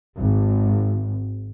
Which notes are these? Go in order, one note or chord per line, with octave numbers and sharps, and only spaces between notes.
G#1